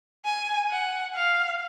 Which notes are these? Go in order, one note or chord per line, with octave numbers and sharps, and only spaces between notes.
G#5
F#5
F5